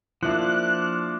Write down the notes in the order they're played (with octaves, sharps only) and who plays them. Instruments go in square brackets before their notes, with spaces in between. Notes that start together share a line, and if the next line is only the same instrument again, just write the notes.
[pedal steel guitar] F3 A#3 D4 [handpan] E4 F4 E5 [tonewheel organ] F#6